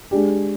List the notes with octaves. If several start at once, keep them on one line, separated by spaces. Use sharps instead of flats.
G#3 D4 G4